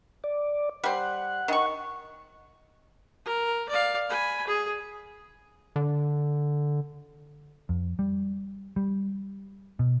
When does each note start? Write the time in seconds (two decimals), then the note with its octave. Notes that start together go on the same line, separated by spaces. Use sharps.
0.24 D5
0.84 G3 C5 F#5
1.48 D#3 C#6
3.25 A#4
3.69 D5 F5
4.09 G#5 B5
4.47 G#4
5.76 D3
7.69 F2
7.99 G3
8.76 G3
9.79 B2